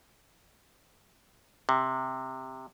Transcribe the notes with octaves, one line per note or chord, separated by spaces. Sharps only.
C3